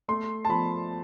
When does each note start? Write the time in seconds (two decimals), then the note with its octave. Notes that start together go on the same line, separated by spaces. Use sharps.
0.08 A3 C6
0.45 A5
0.49 F3 B5